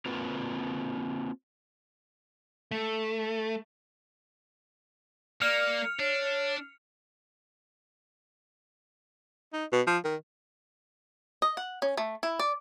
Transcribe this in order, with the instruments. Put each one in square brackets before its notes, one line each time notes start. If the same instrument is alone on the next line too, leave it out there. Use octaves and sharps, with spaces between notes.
[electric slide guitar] A#3 C4 F4 F#4 B4
[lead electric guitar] A3
[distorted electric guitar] A#3 [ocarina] D5 [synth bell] F6 C#7 F7
[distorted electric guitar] D4 [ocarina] C#5
[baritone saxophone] D#4
B2
F3
D#3
[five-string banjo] D#5
F#5
C#4
A3
E4
D5